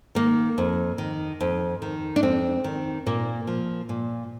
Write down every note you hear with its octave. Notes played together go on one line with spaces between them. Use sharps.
D#3 A#3
F2
D#3
F2
D#3
D4
F2 C4
D#3
A#2 A#3
F3
A#2